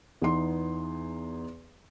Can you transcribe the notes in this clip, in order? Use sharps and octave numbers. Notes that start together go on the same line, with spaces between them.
E2 B3 D#4 C6